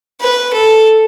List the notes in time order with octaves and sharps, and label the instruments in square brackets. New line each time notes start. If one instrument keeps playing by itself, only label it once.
[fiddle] B4
A4